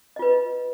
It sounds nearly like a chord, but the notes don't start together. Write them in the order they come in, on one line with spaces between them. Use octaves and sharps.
D#5 F4 B4